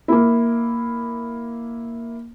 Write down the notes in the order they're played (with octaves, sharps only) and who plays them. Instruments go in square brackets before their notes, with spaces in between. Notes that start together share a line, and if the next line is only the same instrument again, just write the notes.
[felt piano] A#3 E4